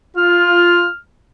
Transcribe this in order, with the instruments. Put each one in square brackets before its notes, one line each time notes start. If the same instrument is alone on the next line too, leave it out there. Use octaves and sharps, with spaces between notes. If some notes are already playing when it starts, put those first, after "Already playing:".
[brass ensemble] F4 [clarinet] F6